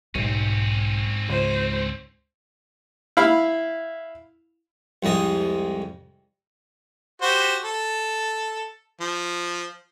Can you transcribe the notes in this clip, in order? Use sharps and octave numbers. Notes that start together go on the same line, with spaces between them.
B1 G#2 C4 C#4
C#2 C5
E4 F5 B5
C2 F2 G#3 D#5
F#4 G4 C5
A4
F3